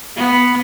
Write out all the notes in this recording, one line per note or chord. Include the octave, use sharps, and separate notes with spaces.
B3